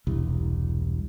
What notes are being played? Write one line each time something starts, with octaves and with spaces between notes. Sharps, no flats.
E1 C2